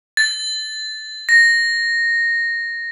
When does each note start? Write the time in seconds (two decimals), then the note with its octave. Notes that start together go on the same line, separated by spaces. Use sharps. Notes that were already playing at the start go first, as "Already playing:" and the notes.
0.17 A6
1.29 A#6